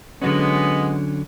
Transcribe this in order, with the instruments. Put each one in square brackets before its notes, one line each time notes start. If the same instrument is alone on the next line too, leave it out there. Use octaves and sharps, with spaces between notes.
[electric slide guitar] D3 F#3 C#4 [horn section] G#3 B3